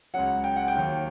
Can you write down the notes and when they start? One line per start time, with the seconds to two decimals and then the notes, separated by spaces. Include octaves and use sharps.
0.14 C#2 C#3 F#3 F#5
0.44 G5
0.56 F#5
0.68 G5
0.74 D#2 D#3 F#3